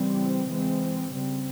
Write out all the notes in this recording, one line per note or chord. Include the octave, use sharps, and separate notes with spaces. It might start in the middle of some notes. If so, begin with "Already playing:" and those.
Already playing: C#3 E3 G3 C4
E3 G#3 C4
C#3 G3 C4